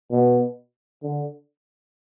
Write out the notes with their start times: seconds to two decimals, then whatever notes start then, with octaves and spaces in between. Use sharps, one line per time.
0.11 B2
1.03 D3